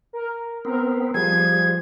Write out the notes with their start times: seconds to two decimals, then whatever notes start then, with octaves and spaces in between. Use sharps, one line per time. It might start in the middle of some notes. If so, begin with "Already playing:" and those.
0.13 A#4
0.65 B3 C4 A#4
1.14 F3 G3 G#4 G#6